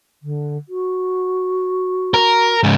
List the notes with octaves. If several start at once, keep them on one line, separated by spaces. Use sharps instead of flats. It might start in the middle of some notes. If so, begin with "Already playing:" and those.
D3
F#4
A#4
G#2 C#3